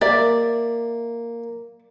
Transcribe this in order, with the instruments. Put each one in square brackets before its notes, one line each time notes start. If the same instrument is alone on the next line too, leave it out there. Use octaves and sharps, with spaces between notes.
[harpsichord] A#3 [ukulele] D5 E5